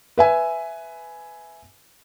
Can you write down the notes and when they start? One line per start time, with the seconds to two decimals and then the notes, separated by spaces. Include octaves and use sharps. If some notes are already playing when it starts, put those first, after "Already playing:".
0.18 B4 E5 G#5